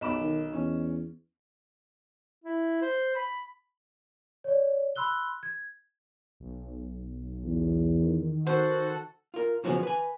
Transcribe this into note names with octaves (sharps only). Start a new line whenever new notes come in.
B1 D#5 B5 D6 E7
D#3
E2 C#4
E4
C5
B5
C#5 D5
B5 C6 E6 F#6 G7
G#6
B1
E2
D#3
F#4 A4 C5 F#5
F4 A#4
B1 C#3 F3 B3 F#4 G#4
B4 G#5